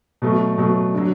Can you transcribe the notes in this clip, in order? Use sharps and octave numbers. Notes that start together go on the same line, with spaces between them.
B2 F#3 A3
B2 F#3 A3
D3 F#3